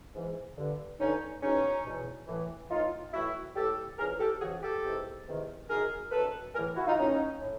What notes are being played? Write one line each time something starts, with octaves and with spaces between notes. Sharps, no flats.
G#2 E3
G2 D3
G2 D3 C#4 D#4
E2 B2 C#4 D#4
E2 B2
A2 E3
A2 E3 D#4 F4
A2 E3 E4 F#4
A2 E3 G4 A4
F2 C#3 E3 G#4 A#4
G4 A4
F2 C#3 E3 F#4 G#4
G4 A4
E2 C3 D#3
E2 C3 D#3
F#2 D#3 G#4 A#4
F#2 D#3 A4 B4
A2 E3 G#4 A#4
E4 F#4
D#4 F4
A2 E3 C#4 D#4
A2